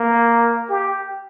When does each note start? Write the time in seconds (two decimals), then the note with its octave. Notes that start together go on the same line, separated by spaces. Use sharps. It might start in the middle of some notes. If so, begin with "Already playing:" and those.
Already playing: A#3
0.69 G4